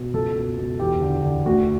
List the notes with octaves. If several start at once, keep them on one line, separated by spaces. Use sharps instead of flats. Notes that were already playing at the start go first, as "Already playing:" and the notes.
Already playing: B2
C#2 A4
B2
B2
E2 G4
D3
D3
D2 F#4